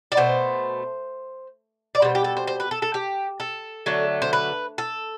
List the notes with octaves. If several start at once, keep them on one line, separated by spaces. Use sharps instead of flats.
D5
B2 A3 C5
D5
B2 G3 C5
G4
A4
C5
C5
B4
A4
A4
G4
A4
D3 F#3 A3
C5
B4
A4